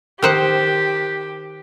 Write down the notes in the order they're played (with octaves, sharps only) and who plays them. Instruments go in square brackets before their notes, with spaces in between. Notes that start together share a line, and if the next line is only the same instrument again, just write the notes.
[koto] D#3 C5 F#5 [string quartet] G4